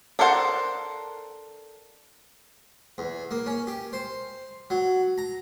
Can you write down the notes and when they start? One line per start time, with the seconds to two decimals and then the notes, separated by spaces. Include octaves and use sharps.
0.19 D4 A4 A#4 C5 F#5
2.98 E2
3.31 A#3
3.46 C#4
3.67 G4
3.93 C5
4.70 F#3
5.18 A#5